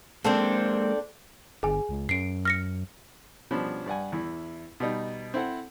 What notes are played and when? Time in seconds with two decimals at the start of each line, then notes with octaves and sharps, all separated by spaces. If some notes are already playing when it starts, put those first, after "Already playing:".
0.25 G#3 A#3 C4 D4 A4
1.63 G1 G#4 G#5
1.89 C#2
2.09 F#2 C7 D7
2.45 F6 A#6 C#7
3.51 B2 F3 G3 B3 C#4 D4
3.86 G2 D5 F#5 G#5
4.12 E2 E4
4.80 B2 G3 D#4
5.34 C4 E4 A4 F#5